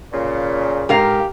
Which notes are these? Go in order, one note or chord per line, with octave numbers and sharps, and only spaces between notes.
A#2 C#3
G#2 G4 A#4 F5